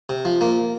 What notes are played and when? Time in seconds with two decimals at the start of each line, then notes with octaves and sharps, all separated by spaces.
0.09 C3
0.25 F3
0.41 A#3